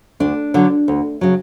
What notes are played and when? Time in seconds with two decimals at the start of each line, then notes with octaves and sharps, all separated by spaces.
0.20 D2 D4
0.54 D3 F#3
0.88 D2
1.21 C#3 F#3